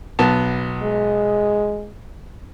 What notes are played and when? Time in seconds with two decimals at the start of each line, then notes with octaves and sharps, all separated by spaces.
0.19 B1 B3 A5
0.83 G#3